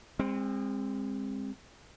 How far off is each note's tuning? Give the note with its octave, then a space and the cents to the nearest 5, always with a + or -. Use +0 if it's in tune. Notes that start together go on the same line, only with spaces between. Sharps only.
G#3 -35 C4 +10